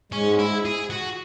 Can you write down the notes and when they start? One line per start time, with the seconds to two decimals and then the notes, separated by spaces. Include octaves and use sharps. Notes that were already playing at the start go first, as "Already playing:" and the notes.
0.12 G#2 G#3 C#4
0.39 E4
0.65 G#4
0.90 F#4